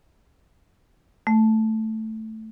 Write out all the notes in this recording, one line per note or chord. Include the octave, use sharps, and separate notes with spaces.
A3